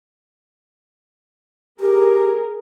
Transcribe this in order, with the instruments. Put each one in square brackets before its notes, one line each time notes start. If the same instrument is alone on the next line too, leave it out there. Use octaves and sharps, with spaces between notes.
[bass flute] G4 [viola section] G#4 A#4